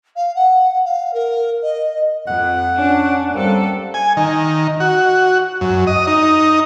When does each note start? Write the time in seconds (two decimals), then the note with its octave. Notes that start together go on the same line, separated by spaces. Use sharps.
0.15 F5
0.35 F#5
0.84 F5
1.13 A#4
1.62 D#5
2.28 F2 F#5
2.78 C#4 D4
3.34 G3 A#3 C4 A4
3.94 G#5
4.17 D#3
4.80 F#4
5.61 F#2
5.87 D#5
6.07 D#4